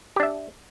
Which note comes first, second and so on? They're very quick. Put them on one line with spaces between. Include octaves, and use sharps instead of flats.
G4 D4 E5